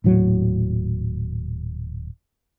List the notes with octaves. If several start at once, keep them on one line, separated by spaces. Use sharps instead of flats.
D#1 A2 F#3